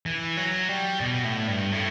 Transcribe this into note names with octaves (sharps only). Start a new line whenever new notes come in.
E3
F#3
G3
B2
A2
G2
A2